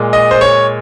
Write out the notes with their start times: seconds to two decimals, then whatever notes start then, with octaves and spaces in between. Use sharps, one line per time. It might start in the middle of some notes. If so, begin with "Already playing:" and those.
Already playing: A#2 G#3
0.13 D#5
0.31 C5
0.41 C#5